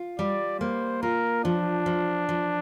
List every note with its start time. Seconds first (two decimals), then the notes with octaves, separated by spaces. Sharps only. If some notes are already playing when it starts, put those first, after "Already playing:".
Already playing: F4
0.19 G3 D5
0.60 A#3 C5
1.02 F4 A#4
1.44 F3 D4
1.86 F3
2.29 F3